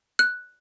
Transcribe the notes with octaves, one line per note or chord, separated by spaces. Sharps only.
F#6